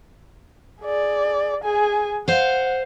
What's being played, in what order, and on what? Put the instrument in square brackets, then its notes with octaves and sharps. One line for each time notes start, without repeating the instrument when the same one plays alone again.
[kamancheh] G#4 D5
G#4 G#5
[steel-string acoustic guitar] C5 F5 [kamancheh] F#5